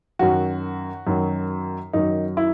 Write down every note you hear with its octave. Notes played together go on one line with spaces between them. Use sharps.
F#2 D#3 F#3 F#4
F#2 D#3 F#3
F#2 D#3 F#3 D#4
E4